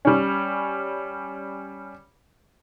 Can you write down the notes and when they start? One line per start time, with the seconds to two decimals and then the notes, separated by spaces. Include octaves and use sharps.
0.05 G3 C#4